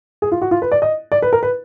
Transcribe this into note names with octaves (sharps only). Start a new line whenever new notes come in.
G#4
F4
F#4
F4
B4
D5
D#5
D5
B4
A#4
B4